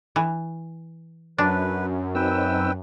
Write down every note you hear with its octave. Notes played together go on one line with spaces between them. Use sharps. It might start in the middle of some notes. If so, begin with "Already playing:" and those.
E3
F#2 D4 B4
C4 D#4 B4 G5 E6